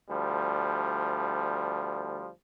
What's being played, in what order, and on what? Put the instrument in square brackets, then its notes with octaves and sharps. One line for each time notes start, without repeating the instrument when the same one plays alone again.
[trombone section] D2 F3 G3